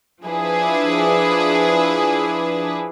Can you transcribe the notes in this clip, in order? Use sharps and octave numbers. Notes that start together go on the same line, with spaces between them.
F3 D4 E4 G#4 B4